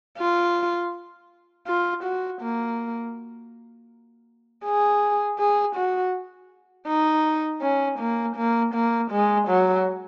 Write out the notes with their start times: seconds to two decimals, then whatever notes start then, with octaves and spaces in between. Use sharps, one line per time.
0.18 F4
1.67 F4
2.04 F#4
2.42 A#3
4.65 G#4
5.39 G#4
5.76 F#4
6.88 D#4
7.62 C#4
8.00 A#3
8.36 A#3
8.75 A#3
9.11 G#3
9.49 F#3